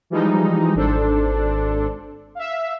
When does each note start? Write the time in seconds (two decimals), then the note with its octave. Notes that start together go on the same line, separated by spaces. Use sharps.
0.10 E3 F3 G3 G#3 D#4
0.75 G#1 D4 A4 C5
2.35 E5 F5